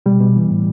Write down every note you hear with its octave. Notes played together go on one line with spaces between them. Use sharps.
B2 G3
B2
E3
A2